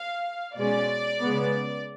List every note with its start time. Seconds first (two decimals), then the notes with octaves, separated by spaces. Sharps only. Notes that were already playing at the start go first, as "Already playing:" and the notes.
Already playing: F5
0.56 B2 G#3 C#4 D5
1.23 C#3 G#3 B3